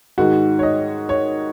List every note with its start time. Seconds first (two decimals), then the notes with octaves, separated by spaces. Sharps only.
0.18 G#2 D#3 G#3 F#4
0.59 C#5
0.63 D#5
1.09 C#5